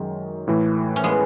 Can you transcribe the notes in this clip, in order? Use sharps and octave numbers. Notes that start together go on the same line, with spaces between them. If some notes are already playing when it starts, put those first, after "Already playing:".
Already playing: F#2 D#3 F#3 G#3
A2 E3 A3
C#4
G#3 B3